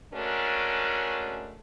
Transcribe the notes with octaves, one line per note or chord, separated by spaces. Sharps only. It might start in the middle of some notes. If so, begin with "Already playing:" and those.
G#3 A3 C#4 D4 F#4 A#4